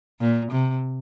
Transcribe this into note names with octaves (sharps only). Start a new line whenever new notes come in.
A#2
C3